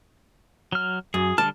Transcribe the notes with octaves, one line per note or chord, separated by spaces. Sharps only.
F#3 F6
F#2 G#4
D3 G3 A5 F6